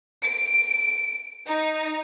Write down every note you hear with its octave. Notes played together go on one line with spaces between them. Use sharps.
D7
D#4